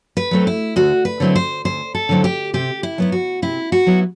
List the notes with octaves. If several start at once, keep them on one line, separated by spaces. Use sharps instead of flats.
B4
F#3 A3 C4
E4
D2 F#4
B4
D3 F#3 C4 E4
C5
D2 C5
A4
D3 F#3 C4 E4
G4
C3 G4
E4
F#3 B3 E4
F#4
C3 E4
F#4
F#3 B3 E4